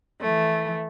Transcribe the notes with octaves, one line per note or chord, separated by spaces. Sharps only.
E3 A3